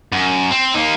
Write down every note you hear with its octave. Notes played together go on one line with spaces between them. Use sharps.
F#2
C4
A#3 D#4